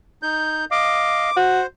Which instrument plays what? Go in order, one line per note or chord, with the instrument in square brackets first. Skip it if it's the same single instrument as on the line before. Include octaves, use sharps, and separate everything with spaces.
[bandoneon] D#4 G6
[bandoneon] D#5 F5 [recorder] D6
[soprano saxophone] F#4 [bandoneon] C5